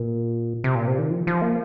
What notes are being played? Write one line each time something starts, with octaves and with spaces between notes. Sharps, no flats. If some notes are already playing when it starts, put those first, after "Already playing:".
Already playing: A#2
C3
A#2
C3
D#3
F3
F3
A#3